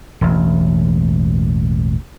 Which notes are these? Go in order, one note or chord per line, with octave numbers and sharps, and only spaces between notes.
E1 A1